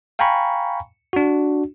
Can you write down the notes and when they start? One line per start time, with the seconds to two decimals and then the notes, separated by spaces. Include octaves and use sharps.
0.19 F5 G5 G#5 A#5 B5 C#6
1.13 D4 F#4